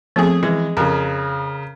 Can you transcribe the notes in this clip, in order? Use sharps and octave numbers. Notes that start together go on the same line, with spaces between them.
F3 A3 B3 C4 G#4
E3 G#3
F2 C#3 A#4